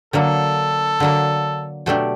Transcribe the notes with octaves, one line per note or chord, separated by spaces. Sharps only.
D3 F#3 A#3 A4
D3 F#3 A#3
B2 F#3 A3 D4 G4